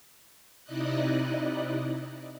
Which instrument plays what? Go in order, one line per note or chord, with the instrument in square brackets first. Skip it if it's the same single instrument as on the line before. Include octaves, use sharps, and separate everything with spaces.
[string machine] C3 D#4 E4 D5 D#5 F#6